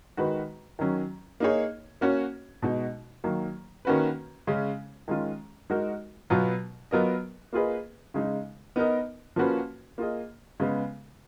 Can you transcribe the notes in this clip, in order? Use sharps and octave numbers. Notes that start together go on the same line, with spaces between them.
D#3 G#3 D#4 F#4 B4
D#3 F#3 C#4
A#3 D#4 G#4 C#5
A#3 C#4 F#4 C#5
B2 G#3 D#4 F#4
D#3 F#3 A#3
D#3 A#3 C#4 F#4 B4
C#3 G#3 C#4
D#3 G#3 C#4 F4
G#3 D#4 F#4 A#4
B2 F#3 B3 F4
F#3 B3 F4 A#4 D#5
A#3 F4 G#4 B4 D#5
C#3 G#3 D#4
B3 D#4 A#4 D#5
F3 A#3 C#4 F#4 B4
A#3 F4 G#4 D#5
C#3 G#3 B3